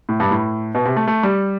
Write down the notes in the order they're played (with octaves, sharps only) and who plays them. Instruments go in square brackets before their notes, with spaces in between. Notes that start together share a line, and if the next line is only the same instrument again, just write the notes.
[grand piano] A2
G2
A2
B2
C3
A3
A3
G3